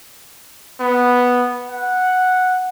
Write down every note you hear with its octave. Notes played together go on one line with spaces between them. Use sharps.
B3
F#5